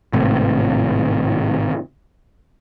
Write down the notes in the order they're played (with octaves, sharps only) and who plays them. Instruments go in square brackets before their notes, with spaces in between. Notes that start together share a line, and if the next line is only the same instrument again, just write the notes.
[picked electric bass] G#1 A2 C3